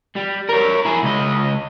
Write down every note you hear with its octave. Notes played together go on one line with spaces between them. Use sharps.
G3
A#4 C#5
E4 G#4
C#2 D#5